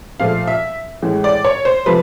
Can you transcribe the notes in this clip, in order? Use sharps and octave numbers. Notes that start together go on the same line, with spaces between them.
A#2 F3 A3 F5
E5
A2 E3 G#3
D5
C#5
C5
C3 F3 A3 B4